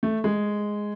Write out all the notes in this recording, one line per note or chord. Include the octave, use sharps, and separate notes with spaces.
A3
G#3